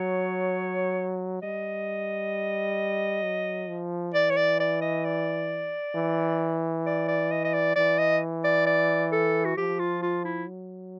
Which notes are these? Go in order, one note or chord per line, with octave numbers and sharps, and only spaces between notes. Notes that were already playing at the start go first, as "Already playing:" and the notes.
Already playing: F#3 C#5
G3 D#5
F#3
F3
E3 D5
C#5
D5
D5
D#5
D5
E3
D5
D5
D#5
D#5
D5
E3 D5
D#5
D5
D5
A4
F#4
F3 G4
F4
F4
E4
F#3